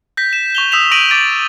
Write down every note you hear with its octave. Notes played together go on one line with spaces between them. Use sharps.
G6 A#6 B6
E7
C#6 F7 G7
D#6 E6 B6 E7 F7
C#6 A#6 D7 D#7 F7 F#7
D6 A6 D7 D#7